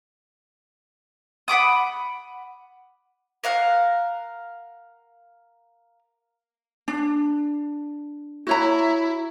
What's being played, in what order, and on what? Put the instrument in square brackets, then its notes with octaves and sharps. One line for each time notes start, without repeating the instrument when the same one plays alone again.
[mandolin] F#5 B5 D6 D#6
A#4 F5 F#5
[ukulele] D4
[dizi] E4 [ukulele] F#4 C#5 A#5